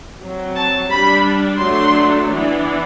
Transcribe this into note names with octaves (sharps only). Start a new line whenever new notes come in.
F#3 C4
A5
G3 D4 B5
F#3 A3 D4 C6
E3 B3 D4